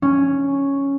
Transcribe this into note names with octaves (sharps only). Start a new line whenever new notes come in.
C#4